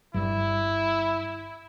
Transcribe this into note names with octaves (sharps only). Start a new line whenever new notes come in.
G1 G2 G3 E4